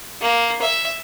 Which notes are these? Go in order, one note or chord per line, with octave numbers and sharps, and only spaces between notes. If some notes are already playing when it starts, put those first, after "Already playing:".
A#3
E5